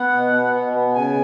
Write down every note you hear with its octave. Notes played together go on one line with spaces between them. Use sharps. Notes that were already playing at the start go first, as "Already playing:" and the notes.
Already playing: B3 F#5
B2
B3
B2
B3
C#3 G#5